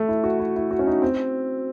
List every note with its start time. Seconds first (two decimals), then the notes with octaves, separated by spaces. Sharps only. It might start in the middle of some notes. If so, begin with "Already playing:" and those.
Already playing: A3
0.08 E4
0.24 F#4
0.39 E4
0.56 E4
0.71 F#4
0.79 C#4
0.87 D#4
1.02 C4